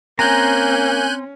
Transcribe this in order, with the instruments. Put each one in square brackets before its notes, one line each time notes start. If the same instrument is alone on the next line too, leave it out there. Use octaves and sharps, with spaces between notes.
[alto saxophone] A#3 [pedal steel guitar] C4 A#5 [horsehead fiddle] C#4 [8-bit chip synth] G#5 F#6 G6